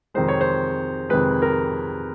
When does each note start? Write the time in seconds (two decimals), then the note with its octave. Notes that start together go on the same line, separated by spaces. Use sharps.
0.14 F2 C3 D#3 G#3 C5
0.28 C#5
0.41 C5
1.09 F2 C3 D#3 G#3 B4
1.42 A#4